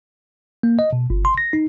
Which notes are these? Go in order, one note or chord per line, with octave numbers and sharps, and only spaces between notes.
A#3
D#5
B2
G1
C6
A#6
D#4